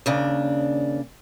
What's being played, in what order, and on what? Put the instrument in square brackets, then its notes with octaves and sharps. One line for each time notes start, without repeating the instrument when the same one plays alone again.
[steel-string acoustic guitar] D#2 C#3 D4